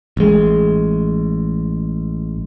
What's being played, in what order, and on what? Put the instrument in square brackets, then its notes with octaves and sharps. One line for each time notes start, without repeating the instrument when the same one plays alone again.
[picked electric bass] A1 G#3